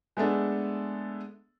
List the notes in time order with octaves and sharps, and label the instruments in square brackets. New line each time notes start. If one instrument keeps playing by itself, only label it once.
[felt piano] G#3 A3 B3 D4 A4